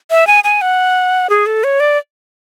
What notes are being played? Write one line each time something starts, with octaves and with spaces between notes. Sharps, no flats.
E5
G#5
G#5
F#5
G#4
A4
C#5
D5